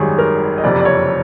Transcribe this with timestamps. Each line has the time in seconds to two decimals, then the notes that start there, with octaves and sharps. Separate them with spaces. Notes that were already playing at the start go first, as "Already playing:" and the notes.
Already playing: G#1 F#2 D#3 G3 G#4
0.18 A#4
0.58 D#5
0.64 F#1 F2 C3 D5
0.80 D5
0.85 C#5